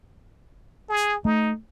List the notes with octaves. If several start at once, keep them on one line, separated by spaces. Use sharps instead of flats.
G#4
A3 D#4